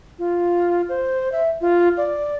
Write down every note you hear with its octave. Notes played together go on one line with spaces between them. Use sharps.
F4
C5
E5
F4
D5